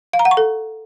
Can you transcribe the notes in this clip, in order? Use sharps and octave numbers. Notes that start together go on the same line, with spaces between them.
F5
A#5
F#5
C#6
A4